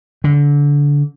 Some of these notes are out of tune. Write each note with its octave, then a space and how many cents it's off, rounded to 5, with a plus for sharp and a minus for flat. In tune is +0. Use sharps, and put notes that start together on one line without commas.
D3 -25